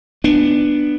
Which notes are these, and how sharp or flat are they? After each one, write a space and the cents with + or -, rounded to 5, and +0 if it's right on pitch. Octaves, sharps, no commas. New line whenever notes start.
B3 +0 D4 +15